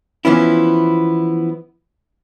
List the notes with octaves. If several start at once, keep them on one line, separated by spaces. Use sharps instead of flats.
E3 F3 B3 C#4 E4